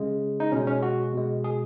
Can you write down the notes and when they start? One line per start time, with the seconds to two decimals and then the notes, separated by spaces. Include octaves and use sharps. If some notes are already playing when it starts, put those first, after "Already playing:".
Already playing: C#3 G#3
0.40 D#4
0.52 B2 G#3 C#4
0.67 C#4
0.83 F#4
1.13 B2 G#3
1.44 G#4